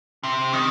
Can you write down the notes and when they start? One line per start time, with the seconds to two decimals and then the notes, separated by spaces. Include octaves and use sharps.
0.23 C3
0.53 D#3